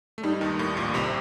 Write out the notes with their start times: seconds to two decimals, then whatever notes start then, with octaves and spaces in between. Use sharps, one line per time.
0.18 A3
0.23 G2 G3 D#4
0.41 D#2 D#3
0.59 A2
0.77 A#1 A#2
0.94 C2 C3